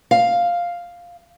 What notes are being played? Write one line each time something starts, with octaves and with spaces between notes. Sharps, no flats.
F5